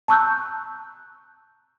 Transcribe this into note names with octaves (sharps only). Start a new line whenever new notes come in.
A5 A#5 C#6 E6 F#6 G6